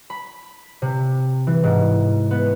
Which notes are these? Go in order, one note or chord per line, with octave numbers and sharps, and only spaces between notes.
B5
C3
E3
G#2
B3